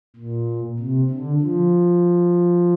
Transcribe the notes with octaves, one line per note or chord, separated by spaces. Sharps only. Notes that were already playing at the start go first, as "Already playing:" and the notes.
A#2
C3
D3
F3